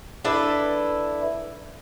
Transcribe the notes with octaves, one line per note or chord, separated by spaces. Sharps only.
D4 E4 A4 B4 D5